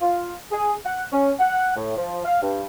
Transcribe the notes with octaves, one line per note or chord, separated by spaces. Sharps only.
F4
G#4
F#5
C#4
F#5
A2
F3
F5
G2